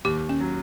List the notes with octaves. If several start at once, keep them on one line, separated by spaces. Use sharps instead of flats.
D#2 G4
C#4
F#3